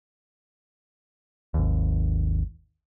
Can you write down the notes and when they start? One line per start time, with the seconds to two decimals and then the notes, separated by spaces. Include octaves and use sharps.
1.54 G#1 D#2